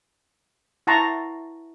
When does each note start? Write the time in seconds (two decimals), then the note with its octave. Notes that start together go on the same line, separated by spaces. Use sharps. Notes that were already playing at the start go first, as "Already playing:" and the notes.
0.87 E4 F#5 A5 A#5 C6 C#6